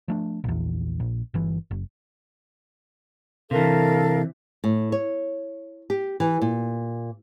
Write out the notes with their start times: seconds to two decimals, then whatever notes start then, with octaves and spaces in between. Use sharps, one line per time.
0.08 F3 A3 D4
0.44 A#1 E2
1.00 A#1
1.34 G1 E3
1.71 F#1
3.51 C3 E3 A4 A#4 F5
4.64 A2
4.92 C#5
5.90 G4
6.20 E3
6.41 A#2